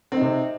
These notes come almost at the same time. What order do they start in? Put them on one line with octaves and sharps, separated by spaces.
C4 D#4 C3